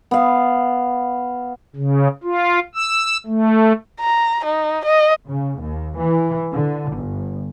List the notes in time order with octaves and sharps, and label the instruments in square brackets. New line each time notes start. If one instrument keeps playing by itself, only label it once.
[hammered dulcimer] B3 F5
[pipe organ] C#3
F4
E6
A3
[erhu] A#5
D#4
D#5
[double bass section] C#3
D#2
E3
D3
G1